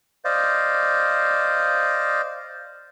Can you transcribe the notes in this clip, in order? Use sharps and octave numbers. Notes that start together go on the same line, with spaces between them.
C5 D5 D#5 F5